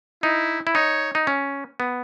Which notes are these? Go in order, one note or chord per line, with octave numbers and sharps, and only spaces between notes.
D#4 E4
E4
D#4 C#5
D#4
C#4
B3